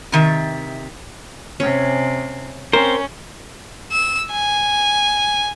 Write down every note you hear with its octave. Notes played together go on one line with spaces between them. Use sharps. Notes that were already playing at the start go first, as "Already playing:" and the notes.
C3 D#3 E5
C3 C#4
C4 C#4 A#4 C5
E6
G#5